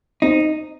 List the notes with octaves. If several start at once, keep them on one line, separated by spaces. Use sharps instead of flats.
C4 D#4